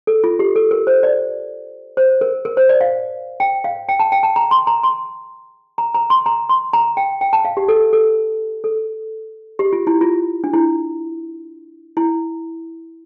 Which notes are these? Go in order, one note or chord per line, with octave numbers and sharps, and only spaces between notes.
A4
F4
G4
A4
A#4
C5
D5
C5
A#4
A#4
C5
D5
F5
G5
F5
G5
A5
G5
A5
A#5
C6
A#5
C6
A#5
A#5
C6
A#5
C6
A#5
G5
G5
A5
F5
G4
A4
A4
A4
G4
F4
E4
F4
D4
E4
E4